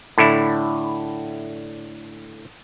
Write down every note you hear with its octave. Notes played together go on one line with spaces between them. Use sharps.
A2 D3 E4